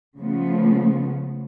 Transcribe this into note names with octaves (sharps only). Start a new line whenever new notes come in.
C#3 F3 A3 B3